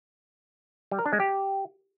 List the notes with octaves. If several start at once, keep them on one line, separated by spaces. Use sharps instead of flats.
G3
A#4
D4
G#3
G4